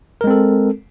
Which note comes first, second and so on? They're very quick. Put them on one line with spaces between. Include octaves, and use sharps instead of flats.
A#4 G#3 C4 A4